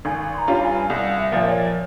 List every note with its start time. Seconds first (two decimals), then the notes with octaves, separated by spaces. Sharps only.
0.05 G#1 G#5
0.34 C6
0.38 A#5
0.48 G2 G3 C#4 F4
0.61 G#5
0.89 C2 F5
1.18 E5
1.32 A#2 F3 A#3
1.46 C#5